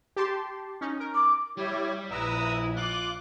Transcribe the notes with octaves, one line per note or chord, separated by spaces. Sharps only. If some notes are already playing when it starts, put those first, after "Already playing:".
G4 A5 C6
C#4 D#4
A#4
D6
G3 E4 G4 C#5
A#1 E4 B4 E5 A#5 D#6 E6
F4 D6 F#6